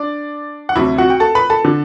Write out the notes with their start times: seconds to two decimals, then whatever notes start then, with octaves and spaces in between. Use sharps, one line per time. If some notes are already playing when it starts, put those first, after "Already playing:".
Already playing: D4 D5
0.69 F#5
0.76 D2 C3 F#3 E4 E5
0.98 F#4 F#5
1.10 G5
1.20 A4 A5
1.35 B4 B5
1.50 A4 A5
1.65 D3